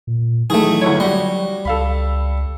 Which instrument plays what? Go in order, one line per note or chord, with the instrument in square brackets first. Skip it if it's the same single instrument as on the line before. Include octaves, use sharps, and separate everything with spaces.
[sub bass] A#2
[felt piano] D#3 E3 [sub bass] F#3 [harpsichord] A3 G#4
[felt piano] G1 E4 C#5
[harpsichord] G3 [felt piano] F#4
[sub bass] C#2 [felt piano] A4 F5 B5